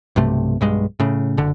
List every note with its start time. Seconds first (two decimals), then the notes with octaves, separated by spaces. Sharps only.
0.16 B1 G2 C3 A3
0.61 B1 G2 G#3
1.00 A2 C#3
1.37 F#1 D3